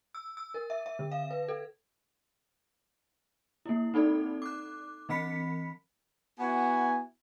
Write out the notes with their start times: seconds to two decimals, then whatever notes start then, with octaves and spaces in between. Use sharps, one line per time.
0.15 E6
0.37 E6
0.54 A#4
0.70 E5
0.86 E5
0.99 D3
1.12 F5
1.31 B4
1.49 A4
3.66 A#3 E4
3.94 C4 D#4 A4 D5
4.42 D6 F#6
5.09 E3 C4 B5 B6 C#7
6.38 B3 E4 F#4 G#5